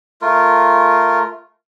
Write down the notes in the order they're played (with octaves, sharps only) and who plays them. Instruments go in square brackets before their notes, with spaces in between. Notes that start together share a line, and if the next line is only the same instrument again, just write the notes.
[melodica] A3 F4 A#4